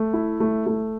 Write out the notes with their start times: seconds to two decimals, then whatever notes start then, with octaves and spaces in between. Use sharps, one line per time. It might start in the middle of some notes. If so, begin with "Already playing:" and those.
Already playing: A3
0.13 E4
0.40 A3
0.66 A3